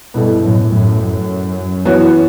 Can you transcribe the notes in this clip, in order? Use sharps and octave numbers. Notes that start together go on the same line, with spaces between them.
G2 B2 B3 E4 A4
F#2 A2
F#2 A2
F#2
E3 B3 F#4 C#5